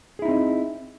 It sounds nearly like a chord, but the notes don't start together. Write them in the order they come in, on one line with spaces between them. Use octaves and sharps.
G#4 E4 D#4 C4 D#5